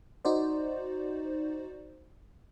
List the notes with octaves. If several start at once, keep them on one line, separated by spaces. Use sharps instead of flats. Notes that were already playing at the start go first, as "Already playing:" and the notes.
D#4 F#4 C5 D5